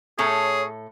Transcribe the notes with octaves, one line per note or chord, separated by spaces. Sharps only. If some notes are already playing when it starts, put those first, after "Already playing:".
A2 C#4 G#4 A4 C#5 A#5